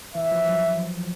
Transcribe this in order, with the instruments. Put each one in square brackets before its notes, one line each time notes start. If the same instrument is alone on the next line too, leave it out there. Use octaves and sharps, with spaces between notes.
[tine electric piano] E3 [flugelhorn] E5
[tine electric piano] F3
F#3